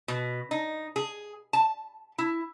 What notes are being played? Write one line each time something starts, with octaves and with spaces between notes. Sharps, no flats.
B2
D#4
G#4
A5
E4